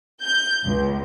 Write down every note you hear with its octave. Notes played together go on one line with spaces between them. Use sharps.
G6
C#2